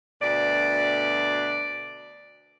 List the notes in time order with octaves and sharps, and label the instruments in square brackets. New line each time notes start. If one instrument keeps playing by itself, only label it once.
[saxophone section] D2 B2 D5